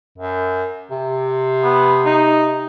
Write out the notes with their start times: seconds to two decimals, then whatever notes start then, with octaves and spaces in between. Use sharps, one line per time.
0.18 F#2
0.91 C3
1.64 B3
2.06 D#4